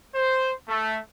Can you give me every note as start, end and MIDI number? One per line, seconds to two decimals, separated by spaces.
0.15 0.52 72
0.69 0.99 57